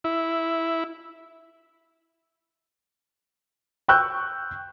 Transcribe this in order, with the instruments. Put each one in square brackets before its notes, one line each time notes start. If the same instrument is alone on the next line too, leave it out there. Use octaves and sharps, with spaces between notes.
[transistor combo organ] E4
[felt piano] G5 C#6 E6 F#6 G6